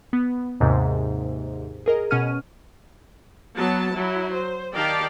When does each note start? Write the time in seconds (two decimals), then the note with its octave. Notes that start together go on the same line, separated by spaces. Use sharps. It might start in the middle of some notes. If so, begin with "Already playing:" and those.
0.13 B3
0.60 D#2 G#2 C3
1.86 G#4 A#4 D#5
2.10 B2 C#4 F#5 F6 D#7
3.55 F#3 B3 A5
3.92 F#3 E4
4.33 C5
4.74 D#3 G4 D5 F5 G5 A5